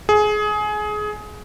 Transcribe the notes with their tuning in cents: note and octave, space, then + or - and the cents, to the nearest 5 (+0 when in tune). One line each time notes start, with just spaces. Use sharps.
G#4 +20